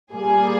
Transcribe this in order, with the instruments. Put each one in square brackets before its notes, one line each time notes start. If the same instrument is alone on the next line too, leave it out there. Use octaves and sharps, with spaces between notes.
[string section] A#2 G3 A#3 G#4